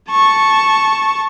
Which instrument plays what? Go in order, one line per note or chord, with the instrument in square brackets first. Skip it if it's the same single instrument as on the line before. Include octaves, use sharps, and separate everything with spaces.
[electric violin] A5 C#6